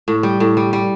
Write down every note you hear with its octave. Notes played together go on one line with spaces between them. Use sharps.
A2
G3
A2
G3
G3